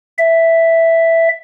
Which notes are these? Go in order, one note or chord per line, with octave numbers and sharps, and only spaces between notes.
E5